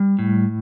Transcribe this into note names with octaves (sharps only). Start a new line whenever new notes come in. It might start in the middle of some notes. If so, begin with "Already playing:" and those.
Already playing: G3
A2